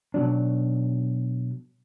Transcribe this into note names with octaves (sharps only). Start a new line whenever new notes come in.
B2 F#3 D4